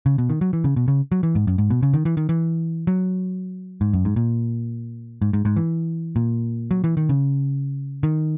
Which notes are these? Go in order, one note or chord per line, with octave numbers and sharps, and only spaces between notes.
C#3
B2
D#3
F#3
E3
C#3
B2
C#3
F#3
E3
G#2
F#2
G#2
B2
C#3
D#3
E3
D#3
E3
F#3
G#2
F#2
G#2
A#2
G#2
G#2
G#2
E3
A#2
F#3
E3
D#3
C#3
D#3